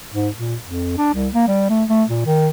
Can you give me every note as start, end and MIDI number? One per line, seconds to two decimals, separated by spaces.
0.14 0.28 44
0.38 0.55 46
0.64 0.97 41
0.98 1.14 62
1.14 1.29 36
1.34 1.46 58
1.48 1.68 55
1.69 1.84 57
1.89 2.03 57
2.08 2.25 46
2.26 2.49 51